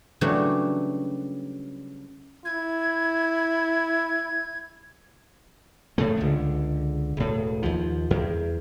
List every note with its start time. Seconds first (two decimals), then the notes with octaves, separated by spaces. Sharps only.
0.21 C#3 E3 F#3 G3 A3 D4
2.45 E4 G#6
5.98 A2 C#3 A3
6.17 C#2 D3
7.17 E1 A2
7.62 D#2 F3
8.11 E2